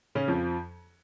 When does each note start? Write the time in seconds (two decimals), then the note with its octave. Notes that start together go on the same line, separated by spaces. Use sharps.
0.15 C#3 C#4
0.28 F2 F3